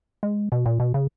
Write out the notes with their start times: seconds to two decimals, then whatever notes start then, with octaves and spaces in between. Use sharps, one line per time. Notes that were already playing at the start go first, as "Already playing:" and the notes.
0.23 G#3
0.52 B2
0.66 A#2
0.80 B2
0.94 C#3